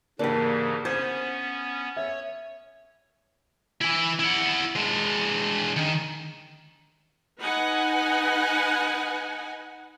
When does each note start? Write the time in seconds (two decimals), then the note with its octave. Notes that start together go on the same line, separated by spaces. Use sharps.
0.19 G#2 C#3 E3 A#3 D4 G4
0.85 B3 C#4 C5 G#6
1.97 C#5 E5
3.81 E3 E4
4.19 E4 F#5
4.75 G#3 D4
5.76 D#3
7.41 D#4 B4 F#5 G#5